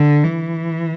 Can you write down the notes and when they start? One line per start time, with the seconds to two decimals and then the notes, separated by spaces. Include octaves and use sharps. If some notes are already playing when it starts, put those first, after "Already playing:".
Already playing: D3
0.24 E3